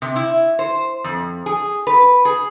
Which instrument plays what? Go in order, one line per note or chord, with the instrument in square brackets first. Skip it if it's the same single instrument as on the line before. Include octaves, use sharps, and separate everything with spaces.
[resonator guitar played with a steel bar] C3
E4
C5
F2
G#4
B4
G#4